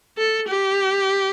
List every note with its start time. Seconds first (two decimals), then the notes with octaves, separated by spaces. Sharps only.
0.18 A4
0.48 G4